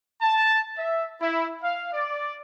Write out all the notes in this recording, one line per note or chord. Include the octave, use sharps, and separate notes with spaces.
A5
E5
E4
F5
D5